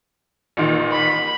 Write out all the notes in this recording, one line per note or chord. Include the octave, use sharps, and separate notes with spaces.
A1 A#2 D#3
B5